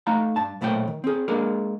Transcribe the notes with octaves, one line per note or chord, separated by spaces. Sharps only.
A3 D#4 F5 A#5
G2 A5
B1 A#2 A3 C5 C#5 G5
D#3
C4 G#4
G#3 A#3 D4 G#4 A#4